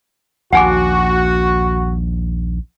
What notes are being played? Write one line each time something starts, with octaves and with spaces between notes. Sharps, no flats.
A#1 D#2 F#4 F#5 G#5 D6